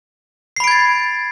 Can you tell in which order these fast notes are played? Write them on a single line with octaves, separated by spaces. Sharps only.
C7 B5 D7 G#6 A6